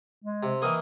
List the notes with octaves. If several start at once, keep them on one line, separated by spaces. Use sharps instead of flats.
G#3
C3
D#3 E3 A#3 D#6